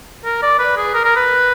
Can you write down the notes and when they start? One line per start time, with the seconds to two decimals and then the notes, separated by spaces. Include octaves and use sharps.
0.25 A#4
0.43 D5
0.59 B4
0.77 G#4
0.94 A#4
1.04 A#4
1.16 B4